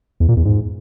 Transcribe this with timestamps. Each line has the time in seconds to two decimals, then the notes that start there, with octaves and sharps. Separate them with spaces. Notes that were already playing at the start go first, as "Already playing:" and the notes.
0.20 E2
0.29 A#2
0.37 E2
0.45 G#2